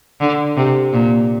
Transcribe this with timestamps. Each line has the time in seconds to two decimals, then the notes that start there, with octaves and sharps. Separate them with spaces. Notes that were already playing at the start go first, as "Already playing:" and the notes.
0.20 D3
0.57 C3
0.93 A#2